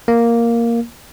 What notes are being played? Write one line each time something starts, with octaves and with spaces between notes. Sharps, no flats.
A#3